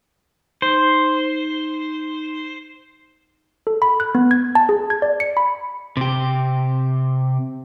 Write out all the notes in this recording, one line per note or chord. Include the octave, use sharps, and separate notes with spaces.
D#4 C5
A4
B5
F#6
B3
G#6
A5
G#4
G#6
D5
C#7
B5
C3 G4